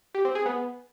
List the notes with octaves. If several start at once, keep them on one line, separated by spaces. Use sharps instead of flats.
G4
C4
G#4
B3